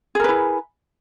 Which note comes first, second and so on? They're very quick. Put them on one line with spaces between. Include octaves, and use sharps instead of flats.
G#4 A#4 B4 E4